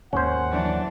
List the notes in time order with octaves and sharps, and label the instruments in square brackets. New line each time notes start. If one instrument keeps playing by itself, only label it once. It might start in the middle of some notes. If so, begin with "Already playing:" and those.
[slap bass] D#2 G#2 D#3 [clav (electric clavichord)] C#4 C5 [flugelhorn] F#5
[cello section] E3 F#3 D4